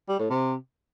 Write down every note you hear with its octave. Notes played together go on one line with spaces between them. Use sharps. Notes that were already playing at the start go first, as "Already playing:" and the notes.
G3
A2
C3